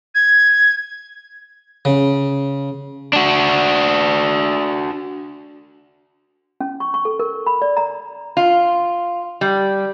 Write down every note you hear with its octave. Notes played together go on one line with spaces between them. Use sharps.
G#6
C#3
D4 F#4
C#4
C#6
C#6
A4
A#4
B5
D5
A#5
F4
G3